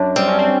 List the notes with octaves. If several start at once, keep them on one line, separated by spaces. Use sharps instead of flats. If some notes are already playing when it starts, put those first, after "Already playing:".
Already playing: F#2 D4
G3 C4
C#4
C4